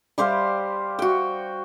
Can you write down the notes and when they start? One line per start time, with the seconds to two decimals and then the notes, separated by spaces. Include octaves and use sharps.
0.18 G3 G4 C5 F5
0.99 F#4 G5